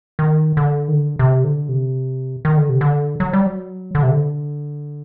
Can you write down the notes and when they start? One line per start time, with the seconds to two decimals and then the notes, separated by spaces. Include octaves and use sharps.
0.19 D#3
0.57 D3
0.88 D#3
0.93 D3
1.19 C3
1.44 D3
1.69 C3
2.45 D#3
2.57 D3
2.69 C3
2.81 D3
3.20 F#3
3.33 G3
3.46 F#3
3.95 D3
4.03 C3
4.11 D3